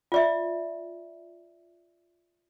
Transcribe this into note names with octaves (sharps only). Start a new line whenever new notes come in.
F4 D5 E5